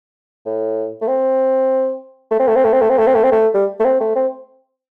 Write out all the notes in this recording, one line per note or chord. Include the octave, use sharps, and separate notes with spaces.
A2
A3
C4
A3
C4
A3
C4
A3
C4
A3
C4
A3
C4
A3
C4
A3
G3
A3
C4
A3
C4